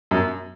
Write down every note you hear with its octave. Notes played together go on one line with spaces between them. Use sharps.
F#2